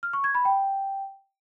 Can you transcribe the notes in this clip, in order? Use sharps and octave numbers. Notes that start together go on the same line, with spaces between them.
F6
C#6
G#6
B5
G5